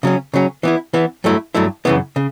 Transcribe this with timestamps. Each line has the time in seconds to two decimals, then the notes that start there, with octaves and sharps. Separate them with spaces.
0.03 C#3 F#3 C#4
0.34 C#3 F#3 C#4
0.63 E3 B3 E4
0.93 E3 B3 E4
1.24 G2 F#3 A3 E4
1.55 G2 F#3 A3 E4
1.85 F#2 C#3 E3 B3 E4
2.16 C#3